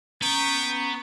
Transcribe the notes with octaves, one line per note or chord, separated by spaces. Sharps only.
B3 C#4 G5 A#5 C#6